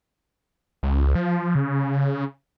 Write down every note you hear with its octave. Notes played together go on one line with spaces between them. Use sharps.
C#2
F3
C#3